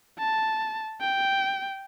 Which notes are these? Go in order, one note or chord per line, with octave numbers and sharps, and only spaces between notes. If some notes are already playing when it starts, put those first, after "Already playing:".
A5
G5